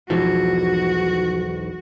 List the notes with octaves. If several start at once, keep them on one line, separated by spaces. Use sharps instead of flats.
B1 E2 G#2 F3 F#4